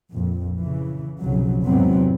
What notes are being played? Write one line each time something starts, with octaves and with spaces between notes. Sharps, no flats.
A#1 F2
C#3 E3
F1 B1 F2 C#3 F#3
E2 G#2 C3 F#3 B3 C4